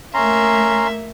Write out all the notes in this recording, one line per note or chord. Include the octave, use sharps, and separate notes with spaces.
A3 A#3 C#4 E5 A#5 C6